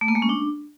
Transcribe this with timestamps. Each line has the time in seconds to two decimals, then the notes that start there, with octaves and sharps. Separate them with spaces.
0.01 A3
0.08 A#3
0.15 G#3
0.22 C#4
0.29 D4